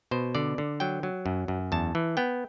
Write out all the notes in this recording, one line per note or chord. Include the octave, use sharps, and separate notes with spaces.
B2 C5
D3 D5
D3
F#3 G5
F#3
F#2
F#2
E2 A5
E3
B3 G5